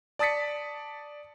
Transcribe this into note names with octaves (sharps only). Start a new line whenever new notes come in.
D5 A5 D#6 A6 B6 C#7